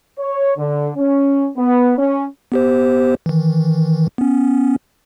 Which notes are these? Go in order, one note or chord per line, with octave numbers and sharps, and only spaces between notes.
C#5
D3
C#4
B3
C#4
B3 G4 C5
D#3 E3
B3 C#4